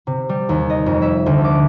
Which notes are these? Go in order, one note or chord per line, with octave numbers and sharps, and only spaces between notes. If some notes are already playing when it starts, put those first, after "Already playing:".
C3
G3
D#2
D#5
F2
E5
D2
D6